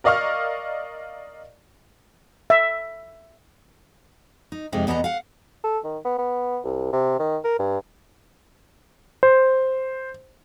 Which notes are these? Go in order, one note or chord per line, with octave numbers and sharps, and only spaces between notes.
A#4 D5 D#5 F5 C#6 F6
E5
D#4
F2 C3 G#3 D#4 G4
E2 B2 B3 G#4 D#5 A#5
F5 F#5
A4
D#3
B3
B3
C2
C3
D#3
A#4
G2
C5